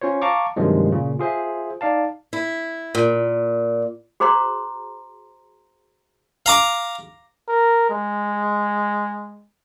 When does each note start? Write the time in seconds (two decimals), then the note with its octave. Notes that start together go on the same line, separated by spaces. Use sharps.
0.01 C#4 F4 C5 C#5
0.22 F5 A5 A#5 C#6 D6
0.56 G2 C3 D#3 F3 F#3 G#3
0.92 A#2 C#3
1.19 F4 G#4 C5 E5
1.81 D#4 D5 F5 A5
2.33 E4
2.95 A#2
4.20 F#4 G#4 C5 A#5 C6
6.46 F5 A#5 D6
7.48 A#4
7.89 G#3